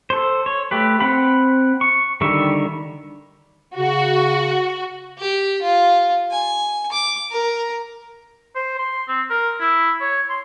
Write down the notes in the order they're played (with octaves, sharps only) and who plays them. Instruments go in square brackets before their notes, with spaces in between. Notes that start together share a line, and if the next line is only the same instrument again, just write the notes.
[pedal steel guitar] A4 C5
C#5
A3 G4 B4
C4 F#5 B5
C#6
D3 D#3 G3 E5 C#6
[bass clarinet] C#3 [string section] F#4
[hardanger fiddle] G4
F4
G#5
D6
A#4
[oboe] C5
C6
C4
A#4
E4
C#5
C6